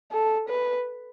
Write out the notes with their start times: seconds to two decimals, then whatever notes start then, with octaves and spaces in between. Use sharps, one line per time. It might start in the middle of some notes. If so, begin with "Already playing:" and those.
0.12 A4
0.49 B4